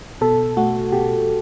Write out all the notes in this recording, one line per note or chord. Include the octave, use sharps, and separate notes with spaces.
B2 A4
A3 F#4
B2 G4